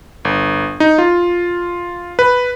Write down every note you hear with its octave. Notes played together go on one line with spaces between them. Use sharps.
G1
D#4
F4
B4